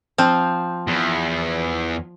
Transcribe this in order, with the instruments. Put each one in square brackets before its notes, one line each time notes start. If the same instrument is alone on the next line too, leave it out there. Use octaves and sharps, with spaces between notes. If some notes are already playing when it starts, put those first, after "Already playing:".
[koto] F3 [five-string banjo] C4
[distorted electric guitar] E2